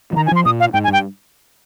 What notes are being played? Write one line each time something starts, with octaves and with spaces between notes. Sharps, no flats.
F3
D#3 A#5
G#5
F3 C6
A#2 D#6
F5
G#2 G5
G#5
G2
G5